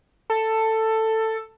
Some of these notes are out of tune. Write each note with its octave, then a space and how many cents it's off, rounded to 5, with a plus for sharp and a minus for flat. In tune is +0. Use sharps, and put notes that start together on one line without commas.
A4 +10